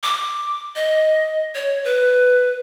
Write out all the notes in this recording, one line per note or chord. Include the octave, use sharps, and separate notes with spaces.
D6
D#5
C#5
B4